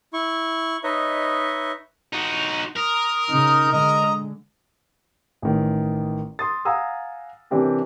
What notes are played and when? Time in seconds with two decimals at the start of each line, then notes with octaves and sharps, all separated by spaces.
0.13 E4 C#6
0.84 D#4 B4 C#5 D#5 E5
2.13 D#4 F#4
2.77 A#4 D#6
3.31 C#3 D#4
3.73 D3 G#3 D#5 A#5
5.42 A1 D#3
6.39 C6 D#6 A6
6.65 F5 F#5 G#5 A#5 D#6 E6
7.51 C3 E3 C4 D4 G4 A#4